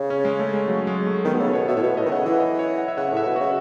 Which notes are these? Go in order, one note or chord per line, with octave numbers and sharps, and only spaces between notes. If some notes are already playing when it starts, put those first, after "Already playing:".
Already playing: C#3
C#4
G#3
A3
G#3
F#3
G#3
A3
D#3 B3
B2
C#3 A4
B2 C#5
B2 E5
A2
B2 C#5
A2 D#5
D#3
C#3 F#5
E3 E5
D#5
C#5
F#5
E5
C#3 F#5
F#5
A2 E5
B2
C#3 F#4